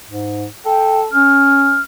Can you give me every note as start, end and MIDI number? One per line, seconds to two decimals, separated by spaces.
0.08 0.46 44
0.65 1.07 69
0.65 1.01 79
1.13 1.80 61
1.13 1.81 89